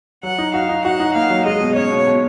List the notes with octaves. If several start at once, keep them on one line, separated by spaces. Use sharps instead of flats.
F#3 F#5
D#4
F#4 F5
D#4
F#4 F#5
D#4
A#3 F5
F#3
G#3 D#5
B2
C#4 C#5
B2
B2